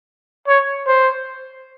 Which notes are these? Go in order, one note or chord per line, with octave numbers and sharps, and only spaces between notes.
C#5
C5